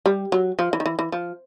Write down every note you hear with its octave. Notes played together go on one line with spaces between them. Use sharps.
G3
F#3
F3
E3
D#3
E3
E3
F3